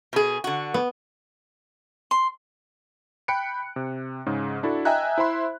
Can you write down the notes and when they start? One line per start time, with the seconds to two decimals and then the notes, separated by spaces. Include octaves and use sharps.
0.13 B2 G#4
0.44 D3 F#4
0.74 B3
2.11 C6
3.28 G5 B5 F#6 C#7 D7
3.76 C3
4.26 G#2 C#3
4.63 D4 E4 F#4 A4
4.85 D#5 E5 G5 G#5 A#5 F#6
5.18 E4 C5 E5 B5 C6